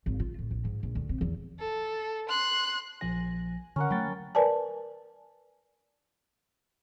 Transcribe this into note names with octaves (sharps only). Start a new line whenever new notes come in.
G#1
F4
A2
A#1
G#2
A#1
D2
C3
E2
A4
C6 F#6
A#1 F3 G#5 A#6
D3 C#4 A#4 F#5
F#3 A3 G5 B5 A6
A#4 B4 D5 G#5 A5